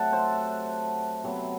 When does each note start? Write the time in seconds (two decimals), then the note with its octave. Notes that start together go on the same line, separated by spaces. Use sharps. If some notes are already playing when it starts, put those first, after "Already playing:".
Already playing: C3 F#3 A3 E5 F#5 A5
0.13 C5
1.24 C3 F#3 B3